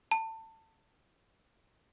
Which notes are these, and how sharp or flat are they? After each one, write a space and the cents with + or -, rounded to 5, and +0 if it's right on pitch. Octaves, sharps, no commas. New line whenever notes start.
A5 +25